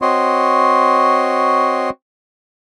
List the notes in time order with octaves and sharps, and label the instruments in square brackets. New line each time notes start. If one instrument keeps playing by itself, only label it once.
[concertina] C4 F#4 C#5 D#5 C6